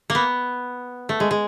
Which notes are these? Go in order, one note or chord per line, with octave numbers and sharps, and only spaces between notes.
A#3
B3
A3
G#3
G#3